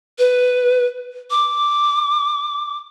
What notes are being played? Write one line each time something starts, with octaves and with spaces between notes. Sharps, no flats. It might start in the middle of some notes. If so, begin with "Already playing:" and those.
B4
D6